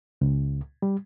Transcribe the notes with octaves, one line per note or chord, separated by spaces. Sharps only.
C#2
G3